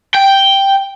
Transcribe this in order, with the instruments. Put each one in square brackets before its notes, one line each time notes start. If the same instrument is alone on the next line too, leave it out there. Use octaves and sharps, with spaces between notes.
[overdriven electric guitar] G5